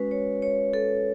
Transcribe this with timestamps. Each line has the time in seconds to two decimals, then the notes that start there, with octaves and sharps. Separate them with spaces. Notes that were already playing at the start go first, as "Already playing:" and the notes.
Already playing: G#3 C#4 F#4 B4
0.11 C#5
0.42 C#5
0.74 A4